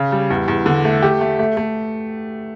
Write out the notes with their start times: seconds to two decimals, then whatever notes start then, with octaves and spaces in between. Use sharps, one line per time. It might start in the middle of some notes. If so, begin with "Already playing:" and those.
Already playing: C#3
0.12 G3
0.30 E2
0.48 E2
0.66 D3
0.85 A3
1.02 G4
1.21 A3
1.39 A3
1.57 A3